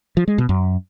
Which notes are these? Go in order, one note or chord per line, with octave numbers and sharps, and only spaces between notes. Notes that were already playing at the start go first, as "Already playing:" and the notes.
F3
G#3
B2
F#2